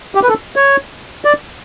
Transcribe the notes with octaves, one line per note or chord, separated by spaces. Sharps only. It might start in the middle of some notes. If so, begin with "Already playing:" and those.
G4
B4
A4
C#5
D5